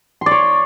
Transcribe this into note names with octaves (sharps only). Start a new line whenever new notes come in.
C#5 D5 C6